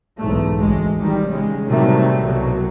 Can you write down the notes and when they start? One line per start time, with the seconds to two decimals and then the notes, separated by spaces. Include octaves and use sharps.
0.19 B1 E2 G#2 A3
0.59 A1 D2 G#3
0.99 D#3 G3
1.27 C#3 G#3
1.68 A2 C3 D#3 F#3 G3 A3
2.23 C2 B2 F#3